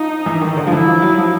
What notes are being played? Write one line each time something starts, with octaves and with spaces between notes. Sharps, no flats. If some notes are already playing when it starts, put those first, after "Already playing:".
Already playing: F3 D#4
E3
D#3
D3
F3
E3 E4
F3
F#3
F3